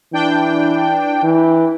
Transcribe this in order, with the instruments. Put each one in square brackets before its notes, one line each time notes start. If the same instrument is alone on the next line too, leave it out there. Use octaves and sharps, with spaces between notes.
[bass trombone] E3 [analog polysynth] D4 G5
[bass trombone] E3